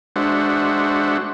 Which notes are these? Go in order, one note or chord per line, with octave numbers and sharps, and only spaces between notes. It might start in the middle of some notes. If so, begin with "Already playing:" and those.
G#3 D4 F#4 C5 E5 F#5